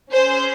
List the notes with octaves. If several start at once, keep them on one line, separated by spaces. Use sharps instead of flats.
C#4 G#4 C5